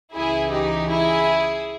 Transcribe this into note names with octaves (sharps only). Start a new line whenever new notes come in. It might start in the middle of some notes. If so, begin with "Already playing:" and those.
C#2 C#3 E3 E4 G#4
D#4 G4
E4 G#4